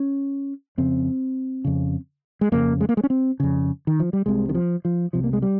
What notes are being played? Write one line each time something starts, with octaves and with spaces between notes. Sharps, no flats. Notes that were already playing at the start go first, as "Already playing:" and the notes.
Already playing: C#4
F2 C#3 C4
F2 C#3
G#3
F2 C#3 A#3
G#3
A#3
G#3
C#4
C4
F2 C#3
D#3
F3
G3
C2 C3 G#3
D#3
F3
F3
C2 C3 F3
A#3
G#3
G3